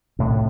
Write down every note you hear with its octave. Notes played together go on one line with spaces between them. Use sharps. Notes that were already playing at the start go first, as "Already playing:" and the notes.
A2 C3